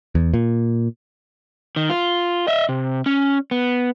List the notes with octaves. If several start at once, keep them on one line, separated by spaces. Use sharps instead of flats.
E2
A#2
D#3
F4
D#5 E5
C3
C#4
B3